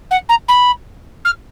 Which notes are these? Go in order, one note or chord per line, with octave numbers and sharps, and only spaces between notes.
F#5
A#5
B5
F6